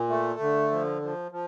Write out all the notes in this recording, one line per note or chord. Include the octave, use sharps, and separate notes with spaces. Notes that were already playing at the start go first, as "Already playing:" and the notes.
Already playing: A#2
A3
D3
F3
F3
F3